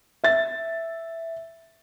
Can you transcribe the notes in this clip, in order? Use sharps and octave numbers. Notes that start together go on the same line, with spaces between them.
E5 A6